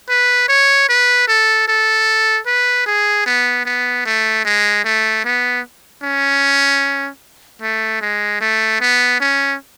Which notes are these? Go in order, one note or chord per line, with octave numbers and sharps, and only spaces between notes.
B4
C#5
B4
A4
A4
B4
G#4
B3
B3
A3
G#3
A3
B3
C#4
A3
G#3
A3
B3
C#4